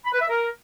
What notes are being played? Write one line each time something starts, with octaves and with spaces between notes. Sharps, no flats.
B5
B4
E5
A#4